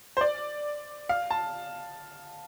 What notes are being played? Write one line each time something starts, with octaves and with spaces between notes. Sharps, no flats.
C5
D5
F5
A5